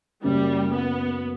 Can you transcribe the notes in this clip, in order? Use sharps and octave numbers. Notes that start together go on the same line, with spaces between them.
F#1 F#2 C#3 G3
B3